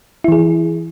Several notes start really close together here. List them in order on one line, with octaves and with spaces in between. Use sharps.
E4 E3 G#4